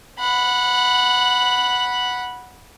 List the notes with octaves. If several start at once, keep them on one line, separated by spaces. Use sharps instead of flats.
F#5 B5